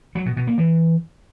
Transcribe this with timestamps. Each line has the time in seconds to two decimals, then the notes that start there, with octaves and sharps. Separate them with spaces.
0.15 F#3
0.26 B2
0.37 B2
0.47 A#3
0.58 E3